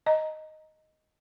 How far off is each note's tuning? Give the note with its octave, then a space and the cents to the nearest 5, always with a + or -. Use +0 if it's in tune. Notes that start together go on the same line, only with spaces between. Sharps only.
D#5 +0 A#5 +0